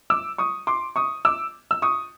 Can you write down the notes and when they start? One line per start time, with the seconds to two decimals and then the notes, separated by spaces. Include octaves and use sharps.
0.10 D6 E6
0.38 C#6 D#6
0.67 C6 D6
0.96 C#6 D#6
1.25 D6 E6
1.71 E6
1.82 C#6 D#6